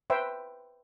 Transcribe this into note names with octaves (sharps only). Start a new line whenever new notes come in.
B4 C5 E5 G5